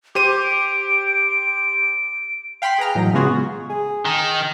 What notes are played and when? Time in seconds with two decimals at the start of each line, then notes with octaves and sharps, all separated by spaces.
0.15 G4 C5 D6 D#7
0.43 D7
2.62 F5 G5 B5 C6 B6
2.78 G#4 B4 A#5 F6
2.95 A2 E3 F#3 D#4
3.13 C#3 G#3 B3 F4 F#4 G#4
3.70 G#4
4.05 D#3